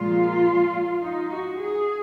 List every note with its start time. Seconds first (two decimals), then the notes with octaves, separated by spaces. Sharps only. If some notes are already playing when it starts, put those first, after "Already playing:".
Already playing: A#2 F3 G#3 F4
1.01 D#4
1.30 F#4
1.57 G#4